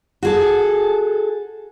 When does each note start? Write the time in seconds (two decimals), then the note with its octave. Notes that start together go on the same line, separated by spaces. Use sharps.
0.23 F#4 G#4 A4